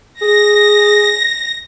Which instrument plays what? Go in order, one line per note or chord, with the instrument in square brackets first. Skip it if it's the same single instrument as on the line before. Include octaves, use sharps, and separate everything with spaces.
[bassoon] G#4 [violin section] A#6